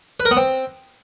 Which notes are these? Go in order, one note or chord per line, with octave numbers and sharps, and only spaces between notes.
B4
A#4
B3
C4